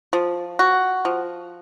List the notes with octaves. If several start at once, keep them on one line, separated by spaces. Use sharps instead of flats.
F3
F#4
F3